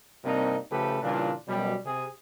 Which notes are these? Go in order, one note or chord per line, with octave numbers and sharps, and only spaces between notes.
G2 C3 A#3 C4 D4 D#4
C#3 F3 A3 G4 A4 B4
A#2 C#3 E3 G3 D4 F4
F#2 B2 G3
C3 G#4